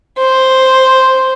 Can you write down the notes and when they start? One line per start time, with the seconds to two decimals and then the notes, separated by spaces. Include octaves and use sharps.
0.18 C5